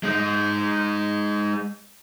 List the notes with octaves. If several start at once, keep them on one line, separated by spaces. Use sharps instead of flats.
G#3 D#4